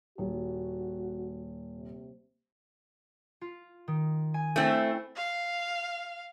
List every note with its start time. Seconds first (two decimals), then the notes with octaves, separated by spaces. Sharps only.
0.18 D#1 F#4
1.75 C3
3.41 F4
3.88 D#3
4.34 G#5
4.56 A3 C4 E4
5.17 F5